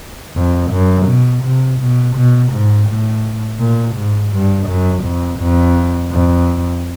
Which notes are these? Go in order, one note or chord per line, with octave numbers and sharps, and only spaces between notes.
F2
F#2
B2
C3
B2
B2
G#2
A2
A#2
G#2
G2
F#2
F2
F2
F2